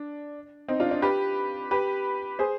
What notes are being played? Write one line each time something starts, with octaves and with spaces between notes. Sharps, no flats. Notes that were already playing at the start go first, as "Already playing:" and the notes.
Already playing: D4
C4 D#4
D4 F4
D4
G4 B4
G4 B4
G#4 C5